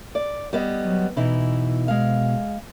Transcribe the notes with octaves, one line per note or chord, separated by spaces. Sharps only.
D5
G3 B3 D#5
F#3
B2 E3 D#4 E4
G#3 F5